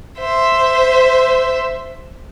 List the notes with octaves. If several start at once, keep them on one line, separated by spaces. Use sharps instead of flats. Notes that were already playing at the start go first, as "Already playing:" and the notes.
C5 E5